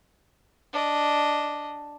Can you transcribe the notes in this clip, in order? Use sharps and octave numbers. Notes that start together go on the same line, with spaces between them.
D4 D#5